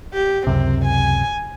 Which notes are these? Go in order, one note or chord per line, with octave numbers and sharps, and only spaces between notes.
G4
C#2 F#2 C3 C4
G#5